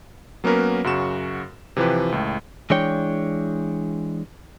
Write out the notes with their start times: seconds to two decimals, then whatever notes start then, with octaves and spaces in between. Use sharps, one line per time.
0.44 F#3 A#3 B3 C#4 A#4 B4
0.84 F#2 C#3 F#4 C#6 E7
1.76 C3 E3 F3 G4 B4
2.12 C#2 A2
2.70 E3 G#3 D4 C#5 G5